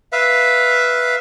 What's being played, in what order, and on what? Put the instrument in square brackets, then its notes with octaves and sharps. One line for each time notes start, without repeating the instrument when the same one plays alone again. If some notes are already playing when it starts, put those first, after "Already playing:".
[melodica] B4 E5 F5